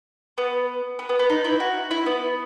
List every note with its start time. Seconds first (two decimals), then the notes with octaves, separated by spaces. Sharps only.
0.38 B3
0.99 B3
1.09 B3
1.19 B3
1.30 D#4
1.45 E4
1.60 F#4
1.91 E4
2.06 B3